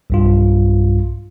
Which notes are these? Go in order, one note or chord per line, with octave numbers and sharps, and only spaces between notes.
B1 G2 F4